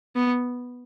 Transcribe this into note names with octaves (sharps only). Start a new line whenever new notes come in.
B3